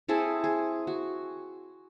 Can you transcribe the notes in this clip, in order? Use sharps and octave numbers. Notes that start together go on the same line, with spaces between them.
C4 E4 G#4 A4
G#4
F#4